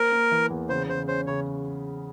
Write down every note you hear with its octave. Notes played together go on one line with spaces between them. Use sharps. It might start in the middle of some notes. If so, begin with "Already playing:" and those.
Already playing: A#3 A#4 C5
A#3
E3
E2
C#3 C5
C#3 C5
C#4 C5
C#3 C#5